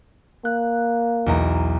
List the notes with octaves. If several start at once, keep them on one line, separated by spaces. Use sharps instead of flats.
A#3 F#6
B1 E2 A#5